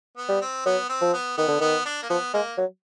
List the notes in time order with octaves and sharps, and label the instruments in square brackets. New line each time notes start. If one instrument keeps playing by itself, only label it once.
[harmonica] B3
[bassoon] G3
[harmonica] C4
[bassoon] F#3 [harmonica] B3
[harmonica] C4
[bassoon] F3
[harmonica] B3
[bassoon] D#3 [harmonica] B3
[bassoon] D3
[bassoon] D#3 [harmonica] B3
[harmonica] D4
A#3
[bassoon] F3 [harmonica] B3
[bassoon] G#3 [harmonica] A#3
[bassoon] F#3